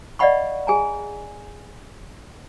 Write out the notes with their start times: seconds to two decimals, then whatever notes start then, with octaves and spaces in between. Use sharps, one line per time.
0.19 D5 D#5 F5 F#5 B5 C#6
0.67 G#4 G#5 A#5